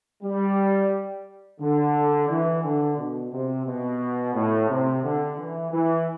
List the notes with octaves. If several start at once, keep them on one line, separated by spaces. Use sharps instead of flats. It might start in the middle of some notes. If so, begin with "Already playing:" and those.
G3
D3
E3
D3
B2
C3
B2
A2
C3
D3
E3
E3